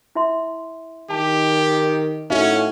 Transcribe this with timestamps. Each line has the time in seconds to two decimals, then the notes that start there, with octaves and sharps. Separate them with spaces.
0.15 E4 E5 C6
1.10 D#3 G4 A5
2.30 A2 C#4 D#4 F#4 E5 F5